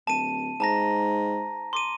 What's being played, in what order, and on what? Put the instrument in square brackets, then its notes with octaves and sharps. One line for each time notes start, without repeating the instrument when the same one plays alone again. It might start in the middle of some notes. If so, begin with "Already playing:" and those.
[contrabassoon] D1 [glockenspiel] A5 D#7
[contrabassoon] G#2 [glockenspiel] A5 A#5 A#6
[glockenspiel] C6 D6 D#7